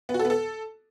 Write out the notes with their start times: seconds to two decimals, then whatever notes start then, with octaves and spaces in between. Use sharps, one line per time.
0.09 B3
0.14 F#4
0.19 A4
0.25 B3
0.30 A4